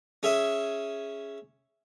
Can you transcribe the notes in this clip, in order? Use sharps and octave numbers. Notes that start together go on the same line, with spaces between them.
C#4 G#4 E5